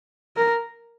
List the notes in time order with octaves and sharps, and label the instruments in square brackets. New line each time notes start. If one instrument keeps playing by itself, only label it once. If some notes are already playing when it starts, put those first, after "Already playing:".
[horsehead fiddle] A#4